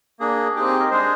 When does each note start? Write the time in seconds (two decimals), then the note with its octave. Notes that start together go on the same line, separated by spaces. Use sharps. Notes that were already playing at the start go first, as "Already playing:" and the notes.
0.20 A#3 D4 G#4
0.56 C4 D#4 G4 G#4
0.67 G#4
0.80 A#4
0.91 G#3 D4 G#4 C5